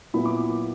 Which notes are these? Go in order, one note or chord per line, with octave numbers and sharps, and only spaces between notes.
A#2 F#3 B3 E4 B5
D6